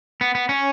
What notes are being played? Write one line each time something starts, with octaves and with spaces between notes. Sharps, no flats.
B3
B3
C#4